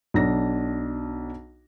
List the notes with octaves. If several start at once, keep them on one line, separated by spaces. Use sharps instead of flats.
B1 D4 A#6